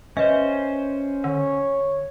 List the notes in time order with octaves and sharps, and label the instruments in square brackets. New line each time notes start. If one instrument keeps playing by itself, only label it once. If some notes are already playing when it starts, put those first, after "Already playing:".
[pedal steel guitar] C#4 C5 [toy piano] B4 D#5 E5
[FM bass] D3 [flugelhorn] C#5